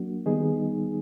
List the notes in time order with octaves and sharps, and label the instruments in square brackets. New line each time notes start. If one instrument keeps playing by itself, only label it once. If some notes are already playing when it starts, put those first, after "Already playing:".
Already playing: [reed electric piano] F#3 A#3 D4 F#4
D#3 G3 B3 D#4 G#4